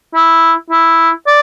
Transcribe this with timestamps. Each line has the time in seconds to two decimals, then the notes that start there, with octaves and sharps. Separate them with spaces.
0.14 E4
0.70 E4
1.27 D5